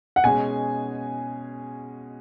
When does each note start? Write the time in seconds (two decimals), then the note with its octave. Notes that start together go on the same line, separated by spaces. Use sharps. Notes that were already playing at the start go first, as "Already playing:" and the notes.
0.16 F#5
0.24 B2 G#3 C#4 G#4 G#5